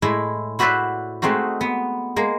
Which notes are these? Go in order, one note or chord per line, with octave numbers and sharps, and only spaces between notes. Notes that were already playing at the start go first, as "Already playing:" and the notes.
A2 G#3 E4
E4 F#4 B4 C5 D5 E5
G#3 A3 C4 D#4 F#4
B3
G#3 A#3